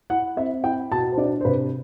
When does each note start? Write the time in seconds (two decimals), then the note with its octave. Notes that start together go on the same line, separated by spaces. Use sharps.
0.10 E4 F#5
0.37 C4 E5
0.64 E4 G5
0.91 B2 A5
1.12 C5
1.18 D4 D5
1.41 C5
1.45 C3 B4